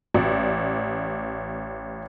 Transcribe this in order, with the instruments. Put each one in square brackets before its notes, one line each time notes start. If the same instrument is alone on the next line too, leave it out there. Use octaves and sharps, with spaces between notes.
[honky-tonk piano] A1 D5